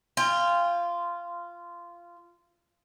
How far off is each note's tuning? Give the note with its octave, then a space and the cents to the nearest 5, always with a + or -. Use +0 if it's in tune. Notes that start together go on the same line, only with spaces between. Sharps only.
F4 -15 G5 +30